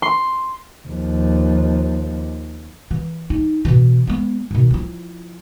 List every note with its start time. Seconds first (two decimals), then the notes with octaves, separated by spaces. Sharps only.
0.02 C6
0.88 D#2 F3
2.91 E3
3.30 D#4
3.65 B2 E3
4.07 G#3 B3
4.51 B2 D#3
4.71 F3 E4